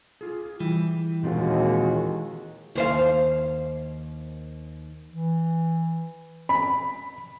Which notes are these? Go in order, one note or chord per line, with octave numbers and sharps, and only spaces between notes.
F4 G#4
E3 G3
D#2 A#2 G#3 C4 F4 F#4
D#2 C5 F5
E3
B5